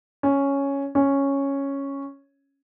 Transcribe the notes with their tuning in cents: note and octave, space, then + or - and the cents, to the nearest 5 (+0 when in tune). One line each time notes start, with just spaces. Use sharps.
C#4 +0
C#4 -5